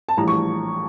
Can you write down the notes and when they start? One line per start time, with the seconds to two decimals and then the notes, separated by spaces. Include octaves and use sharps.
0.09 A5
0.17 A#1 A2 E3 G3 A#5
0.28 C#6